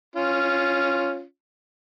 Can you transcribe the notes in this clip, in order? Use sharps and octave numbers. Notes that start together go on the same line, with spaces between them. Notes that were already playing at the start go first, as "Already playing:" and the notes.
C#4 F4